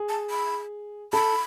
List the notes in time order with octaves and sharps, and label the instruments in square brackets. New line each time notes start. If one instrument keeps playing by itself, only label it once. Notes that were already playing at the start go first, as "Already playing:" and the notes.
Already playing: [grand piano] G#4
[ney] A5
B5
[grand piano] A4 [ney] B5